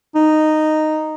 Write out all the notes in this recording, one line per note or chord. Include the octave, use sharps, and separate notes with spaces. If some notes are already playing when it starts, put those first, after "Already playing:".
D#4